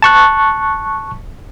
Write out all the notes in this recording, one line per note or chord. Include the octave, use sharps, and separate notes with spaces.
A5 C#6 F#6